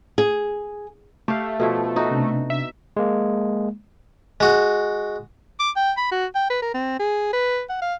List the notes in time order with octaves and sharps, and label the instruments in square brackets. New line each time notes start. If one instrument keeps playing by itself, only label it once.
[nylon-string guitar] G#4
[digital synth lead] A3 [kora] G4 F5
[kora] B2 F3 E4 [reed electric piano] A4
[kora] D#4 F#4
[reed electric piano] C3 D4
[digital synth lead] E5
[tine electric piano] G#3 A#3
[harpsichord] G#3 F#4
[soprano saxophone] D6
G5
B5
F#4
G5
B4
A#4
C4
G#4
B4
F#5
F5